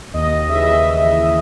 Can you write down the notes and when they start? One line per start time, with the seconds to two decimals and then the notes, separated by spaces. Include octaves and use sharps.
0.14 D#2 D#5
0.49 C#3 E5
0.53 E3 D#5
0.65 E5
0.84 D#2
1.19 C#3 E3